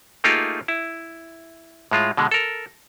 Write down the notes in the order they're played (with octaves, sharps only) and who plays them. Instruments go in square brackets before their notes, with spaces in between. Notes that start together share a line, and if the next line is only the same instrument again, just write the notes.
[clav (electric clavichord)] A3 A#3 D#4 F4 G4 G#4
E4
A2 G#3 F4
B2 D3 G#3
A4 A#4